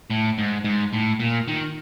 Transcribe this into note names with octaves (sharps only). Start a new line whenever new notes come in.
A2
G#2
G#2
A2
A#2
D#3